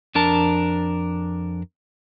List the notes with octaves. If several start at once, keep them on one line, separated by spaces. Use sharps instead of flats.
F2 D4 A#4 A5